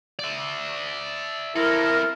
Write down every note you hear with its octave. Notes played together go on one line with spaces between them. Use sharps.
D5 E5
C4 E4 A4 A#4